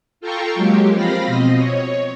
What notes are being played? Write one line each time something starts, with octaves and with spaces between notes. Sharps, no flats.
F4 A4 G5 A#5 C6 C#6
F#3 G#3 A#3 G4
F3 C4 F4 F5 B5 A#6
B2 C4 D#5
C#5